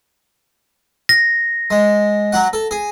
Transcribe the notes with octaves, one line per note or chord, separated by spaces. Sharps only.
A#6
G#3
F#3 F#4 F#5
A4
G#4